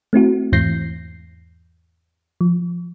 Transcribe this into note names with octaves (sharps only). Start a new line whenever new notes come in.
A3 C4 E4 F#4
E2 G#2 E3 G6 A#6 C7
F3